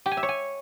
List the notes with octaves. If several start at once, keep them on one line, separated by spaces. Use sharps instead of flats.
G4
G#5
E5
C#5
G#5